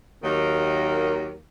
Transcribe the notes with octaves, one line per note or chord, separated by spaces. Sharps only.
D#2 D#3 F#3 A#3